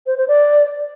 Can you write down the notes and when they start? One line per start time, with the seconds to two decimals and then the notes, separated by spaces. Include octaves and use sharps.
0.07 C5
0.17 C5
0.28 D5